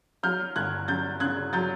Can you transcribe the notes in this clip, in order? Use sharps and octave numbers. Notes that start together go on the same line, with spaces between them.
F#3 F6 G6
G1 F#6 G#6
F#2 G6 A6
C#3 F#6 G#6
F#3 G6 A6